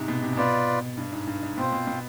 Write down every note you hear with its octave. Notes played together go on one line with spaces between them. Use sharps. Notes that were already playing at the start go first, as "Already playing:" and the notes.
Already playing: G#2 C3
B2
C3
G#2
B2 F4 B4 D5
G2
G#2
G2
G#2
B2 C4 F4 C5
B2
B2